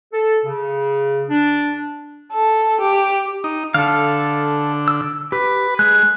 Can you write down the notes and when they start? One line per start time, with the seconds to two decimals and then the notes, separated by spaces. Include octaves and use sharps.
0.13 A4
0.46 C#3
1.30 D4
2.34 A4
2.80 G4
3.44 D#4
3.74 D3 A4 F5
4.88 E6
5.32 G4 B4
5.79 G#3 F#6